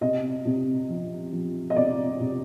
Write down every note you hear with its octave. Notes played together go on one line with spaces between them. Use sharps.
C3 D#5
C3
F3
F3
D#5
C3 D5
C3